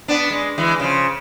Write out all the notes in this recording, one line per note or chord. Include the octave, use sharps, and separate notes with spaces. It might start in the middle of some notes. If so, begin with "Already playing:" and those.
B3 D4
G#3
E3 G#3
C#3 F3